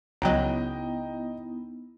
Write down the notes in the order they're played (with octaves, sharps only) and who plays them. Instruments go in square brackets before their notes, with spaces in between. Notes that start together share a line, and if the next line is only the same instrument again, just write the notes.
[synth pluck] C#2 F#3 [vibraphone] B3 D#4 E4 [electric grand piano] D#5 G5 A#5